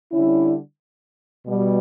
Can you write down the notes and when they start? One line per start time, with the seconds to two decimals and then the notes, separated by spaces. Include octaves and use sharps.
0.12 D3 G3 C#4 E4
1.45 B2 G3